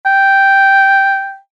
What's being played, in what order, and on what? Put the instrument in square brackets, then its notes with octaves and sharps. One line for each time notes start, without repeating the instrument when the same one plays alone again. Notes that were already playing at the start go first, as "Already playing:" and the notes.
[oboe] G5